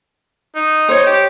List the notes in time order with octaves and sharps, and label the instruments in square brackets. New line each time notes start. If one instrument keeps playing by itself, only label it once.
[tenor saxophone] D#4
[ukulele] C5 C#5
[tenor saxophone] G4